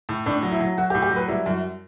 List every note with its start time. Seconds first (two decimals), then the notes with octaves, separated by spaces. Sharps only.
0.09 A2
0.26 A2 D4
0.43 F#3
0.51 E4
0.60 F#3
0.78 F#3 F#4
0.90 G4
0.95 A2
1.02 G4
1.11 F#3
1.16 B4
1.28 G3 E4
1.46 F#2